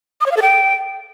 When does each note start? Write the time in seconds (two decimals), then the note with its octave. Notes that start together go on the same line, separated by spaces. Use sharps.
0.21 D#6
0.26 C#5
0.31 F5
0.37 A4
0.42 G5